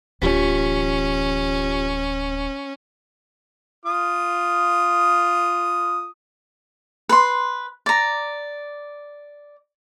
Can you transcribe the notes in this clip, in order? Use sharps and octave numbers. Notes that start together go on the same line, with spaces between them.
D1 E3 C#4 F4 G4 B6
F4 D#6
B4 C6
D5 A#5